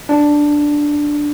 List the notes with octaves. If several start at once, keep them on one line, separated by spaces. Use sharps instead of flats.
D4